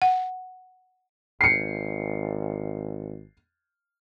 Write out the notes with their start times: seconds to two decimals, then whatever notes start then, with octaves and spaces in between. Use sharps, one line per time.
0.02 F#5
1.41 G#1 C7 C#7